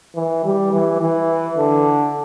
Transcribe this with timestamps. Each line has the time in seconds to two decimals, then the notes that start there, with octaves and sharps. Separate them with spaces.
0.16 E3
0.45 G3
0.73 E3
1.01 E3
1.58 D3